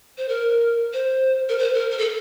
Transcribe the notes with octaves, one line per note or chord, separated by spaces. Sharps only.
C5
A#4
C5
A#4
C5
A#4
A#4
A4